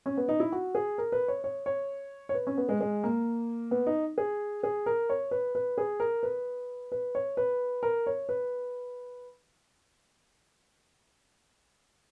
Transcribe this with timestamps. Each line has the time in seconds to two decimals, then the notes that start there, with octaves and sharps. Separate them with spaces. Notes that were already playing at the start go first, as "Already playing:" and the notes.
0.06 C#4
0.17 B3
0.29 D#4
0.40 E4
0.52 F#4
0.75 G#4
0.98 A#4
1.12 B4
1.28 C#5
1.44 C#5
1.66 C#5
2.29 C#5
2.34 B4
2.47 C#4
2.57 B3
2.69 G#3
2.81 G#3
3.04 A#3
3.71 B3
3.87 D#4
4.18 G#4
4.63 G#4
4.86 A#4
5.10 C#5
5.31 B4
5.55 B4
5.78 G#4
6.00 A#4
6.23 B4
6.92 B4
7.15 C#5
7.37 B4
7.83 A#4
8.07 C#5
8.29 B4